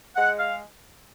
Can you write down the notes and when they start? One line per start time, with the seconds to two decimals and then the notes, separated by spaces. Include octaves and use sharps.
0.16 G#3 F#5
0.39 F5